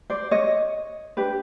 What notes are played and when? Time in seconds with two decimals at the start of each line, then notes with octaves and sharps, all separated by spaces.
0.10 C5 D5
0.31 C#5 D#5
1.17 D4 G4 B4